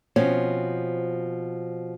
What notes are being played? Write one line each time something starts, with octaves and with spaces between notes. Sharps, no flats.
B2 F3 C4 C#4